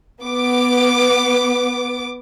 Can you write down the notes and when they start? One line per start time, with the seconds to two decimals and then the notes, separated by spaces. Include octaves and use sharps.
0.25 B3 D6